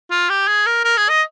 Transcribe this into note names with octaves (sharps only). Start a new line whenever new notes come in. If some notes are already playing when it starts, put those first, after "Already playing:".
F4
G4
G#4
A#4
A#4
G#4
D#5